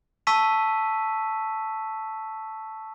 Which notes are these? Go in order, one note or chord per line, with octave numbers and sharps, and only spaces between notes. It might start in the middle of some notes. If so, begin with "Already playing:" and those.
A5 C#6 E6 B6 D#7